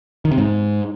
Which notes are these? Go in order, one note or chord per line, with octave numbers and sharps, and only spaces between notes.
D#3
C3
G#2